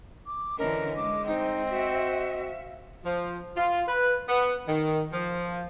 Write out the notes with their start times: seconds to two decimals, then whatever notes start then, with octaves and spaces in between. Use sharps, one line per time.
0.26 D6
0.58 D3 E3 C#4 A#4 D#5
0.96 G#3 D6
1.27 C4 D#4
1.70 F#4 E5
2.47 F5
3.05 F3
3.57 F4
3.87 B4
4.28 B3
4.68 D#3
5.13 F3